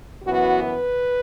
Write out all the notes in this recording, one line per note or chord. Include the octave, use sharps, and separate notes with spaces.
F#2 E3 B3 F#4
B4